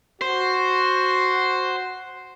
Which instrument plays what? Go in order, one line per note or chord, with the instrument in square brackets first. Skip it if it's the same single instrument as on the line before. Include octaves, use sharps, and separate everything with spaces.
[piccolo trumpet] F#4 [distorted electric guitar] C5